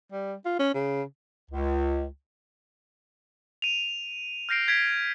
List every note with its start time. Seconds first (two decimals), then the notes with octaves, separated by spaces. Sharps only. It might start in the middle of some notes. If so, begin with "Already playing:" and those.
0.12 G3
0.45 F4
0.59 C#4
0.74 C#3
1.51 C#2
3.62 D#7 F7
4.49 F6 G6 A#6 C7 D7
4.68 G#6 B6 D7